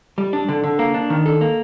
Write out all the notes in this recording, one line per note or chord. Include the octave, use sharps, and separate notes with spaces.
G3
D4
D3
D3
A#3
D4
D#3
A4
A#3